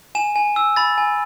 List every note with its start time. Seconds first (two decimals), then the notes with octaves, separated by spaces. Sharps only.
0.15 G#5 E7
0.36 G#5
0.56 E6
0.76 B5 A6
0.98 G#5